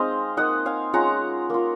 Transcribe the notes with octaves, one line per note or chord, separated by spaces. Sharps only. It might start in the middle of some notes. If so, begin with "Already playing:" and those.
Already playing: G#3 C4 D#4 C5 D#5 F5
A#3 D#4 D#5 F#5
F5 G#5
G#3 C#4 F4 F#5 A#5
A#3 F4